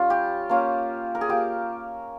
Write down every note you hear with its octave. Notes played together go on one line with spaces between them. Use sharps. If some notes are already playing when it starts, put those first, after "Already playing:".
Already playing: G3 C#4 F4
G4
A#3 C#4 F4
A#4
G#4
A#3 F4 G4